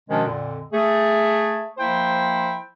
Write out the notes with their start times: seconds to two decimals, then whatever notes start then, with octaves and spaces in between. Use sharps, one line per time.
0.09 B2 D#3 F3 G#3 C#4 D4
0.26 F2 A#2 D3
0.73 A3 G#4
1.78 F3 A#3 E4 C5 G5